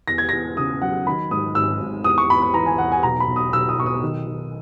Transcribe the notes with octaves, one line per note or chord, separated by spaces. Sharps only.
E2 A#6
G#6
E2 A#6
C#3 D#6
F#3 F#5
D#3 B5
G#2 D#6
G#1 E6
G#1
E2 D#6
C#6
E2 B5
B5
E3 A#5
G#5
E2 F#5
G#5
B1 A#5
B5
B1
D#6
B1 E6
D#6
B1 C#6
D#6
D#3
D#3